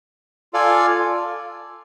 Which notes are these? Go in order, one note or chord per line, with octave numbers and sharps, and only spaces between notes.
F4 A4 D5 F5 G#5